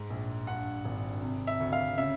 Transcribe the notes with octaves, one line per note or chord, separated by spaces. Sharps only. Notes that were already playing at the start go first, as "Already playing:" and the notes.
Already playing: G#2
A#1
G2 F#5
G#1
C3
E5
D2
F5
C#3 E5